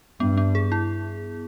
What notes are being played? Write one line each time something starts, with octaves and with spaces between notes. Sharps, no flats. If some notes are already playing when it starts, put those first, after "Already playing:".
G2 B3
B3
G#4
E4